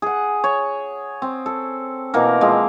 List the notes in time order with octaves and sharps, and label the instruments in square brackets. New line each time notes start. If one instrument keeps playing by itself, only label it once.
[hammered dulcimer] G#4 F#5
C#5
C4
A4
B2 E3 A#3 A#4
F3 G#3 C4